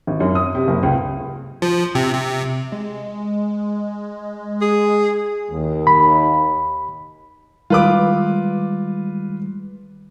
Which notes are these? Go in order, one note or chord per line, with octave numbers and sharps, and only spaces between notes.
G#1
F#2
D#6
C3
F#1
C#2
F3
C3
C3
G#3
G#4
D#2
B5
D#3 G3 G#3 F4 B4 D6